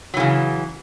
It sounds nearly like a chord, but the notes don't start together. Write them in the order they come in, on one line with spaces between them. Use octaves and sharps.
F#3 E3 C#3